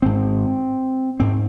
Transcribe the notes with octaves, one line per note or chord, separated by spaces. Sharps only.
G#1 G#2 C4
G#2 C4